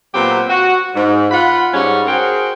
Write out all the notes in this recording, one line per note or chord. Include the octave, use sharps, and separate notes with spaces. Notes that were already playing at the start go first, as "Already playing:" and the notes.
A#2 F#3 B3 C4 F#4 G4
F#4
G#2
F4 F#5 B5
G#2 G3 C#4
F#4 G#4 A#4 C5 G5